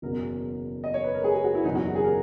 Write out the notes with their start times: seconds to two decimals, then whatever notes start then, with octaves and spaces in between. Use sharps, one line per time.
0.02 F#1 E2 B2 F#3 A#4
0.84 D#5
0.94 C#5
1.04 B4
1.15 A#4
1.24 G#4
1.34 G#4
1.44 F#4
1.55 E4
1.64 F#1 E2 B2 F#3 D#4
1.75 F#4
1.95 G#4
2.04 A#4